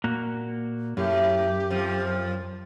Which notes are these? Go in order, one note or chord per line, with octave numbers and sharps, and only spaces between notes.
A#2 A#3 F#4
F#2 A2 G4
F2 F3